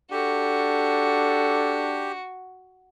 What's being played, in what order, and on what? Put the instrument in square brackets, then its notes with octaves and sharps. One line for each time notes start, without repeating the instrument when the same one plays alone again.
[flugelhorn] D4 [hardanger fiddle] F#4 [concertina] G4 [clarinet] A4